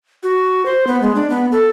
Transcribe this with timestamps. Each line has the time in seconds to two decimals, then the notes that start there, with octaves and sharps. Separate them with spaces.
0.23 F#4
0.66 C5
0.87 B3
1.02 G#3
1.15 D4
1.30 B3
1.52 A4